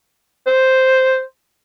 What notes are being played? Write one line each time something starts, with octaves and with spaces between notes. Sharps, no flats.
C5